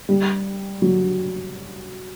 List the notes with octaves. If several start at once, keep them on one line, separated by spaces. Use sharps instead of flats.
G3
F#3